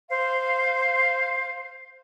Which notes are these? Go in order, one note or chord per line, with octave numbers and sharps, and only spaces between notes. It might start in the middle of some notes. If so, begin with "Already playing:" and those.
C5 F5